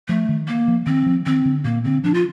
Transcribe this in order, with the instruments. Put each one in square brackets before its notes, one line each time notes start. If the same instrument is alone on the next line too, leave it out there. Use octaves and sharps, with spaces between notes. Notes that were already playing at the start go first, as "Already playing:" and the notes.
[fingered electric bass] F3 [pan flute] A3
[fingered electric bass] D#3
[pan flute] A#3
[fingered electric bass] F3
[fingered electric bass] D#3 [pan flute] C4
[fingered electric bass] F3
[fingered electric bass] D#3 [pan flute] C4
[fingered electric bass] D3
[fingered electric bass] A#2 [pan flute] A#3
[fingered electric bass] D3 [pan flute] C4
[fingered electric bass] F3 [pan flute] D4
[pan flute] F4